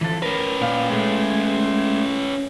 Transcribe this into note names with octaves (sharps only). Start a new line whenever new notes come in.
E3 F3 A4
C#4 A#4 B4
A#2 D5 F5
G#3 A3